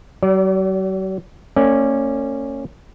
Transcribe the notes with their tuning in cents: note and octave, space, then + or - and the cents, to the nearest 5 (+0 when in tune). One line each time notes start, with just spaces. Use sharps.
F#3 +45 D5 -20
A#3 -45 C#4 -15 D5 +0